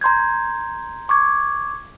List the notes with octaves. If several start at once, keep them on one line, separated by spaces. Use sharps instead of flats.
A#5 C6 G6 G#6
C#6 D6 G#6